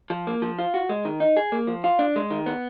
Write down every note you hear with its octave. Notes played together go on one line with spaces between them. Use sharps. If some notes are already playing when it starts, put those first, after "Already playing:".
F3
A#3
F3
F4
F#4
G#3
D#3
D#4
G#4
A#3
F3
F4
D4
G#3
D#3
B3